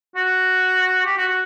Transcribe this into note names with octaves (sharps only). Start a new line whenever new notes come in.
F#4
G4
F#4
F#4